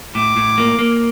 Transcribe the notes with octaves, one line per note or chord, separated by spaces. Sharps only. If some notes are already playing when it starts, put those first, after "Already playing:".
A2 D6
A2
A#3
A#3